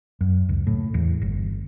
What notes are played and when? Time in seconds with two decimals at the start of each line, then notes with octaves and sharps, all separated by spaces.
0.21 F#2
0.49 C#2
0.67 A2
0.94 E2
1.22 G1